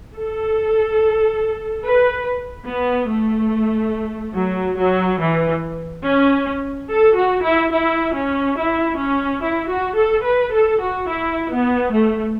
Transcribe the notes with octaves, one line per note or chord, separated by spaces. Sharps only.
A4
B4
B3
A3
F#3
F#3
E3
C#4
A4
F#4
E4
E4
C#4
E4
C#4
E4
F#4
A4
B4
A4
F#4
E4
B3
A3